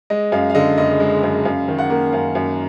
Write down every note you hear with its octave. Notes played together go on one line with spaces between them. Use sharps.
G#3 D#5
F#2 F5
F5
D3 D#5
F#1 D#5
G#3
F#2
F#2 F5
D#3
F#5
A#3
F#2 F5
F#2